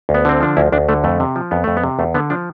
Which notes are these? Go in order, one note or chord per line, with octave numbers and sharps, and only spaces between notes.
D2
B3
D3 C4
F3 D4
D2 E4
D2 D4
D3 A3
F2 A3
C3
F3
F2 B3
F2 A3
B3
C3
E2 A3
D3 B3
F3 D4